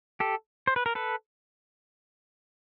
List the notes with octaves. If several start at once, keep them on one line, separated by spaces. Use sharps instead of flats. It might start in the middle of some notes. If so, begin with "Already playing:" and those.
G4 A4
C5
B4
A#4
A4 B4